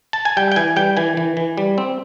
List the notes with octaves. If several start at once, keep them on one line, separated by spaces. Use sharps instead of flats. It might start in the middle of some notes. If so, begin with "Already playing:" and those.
A5
G#5
G3 G5
G5
E3 G#5
G3 G5
E3 G#5
E3
E3
G3
C4